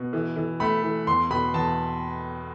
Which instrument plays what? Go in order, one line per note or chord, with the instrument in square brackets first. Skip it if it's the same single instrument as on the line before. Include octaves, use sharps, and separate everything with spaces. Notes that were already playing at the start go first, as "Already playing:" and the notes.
Already playing: [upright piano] B2
E3
E3
A3 B5
E3
E2 C6
B2 B5
E2 A5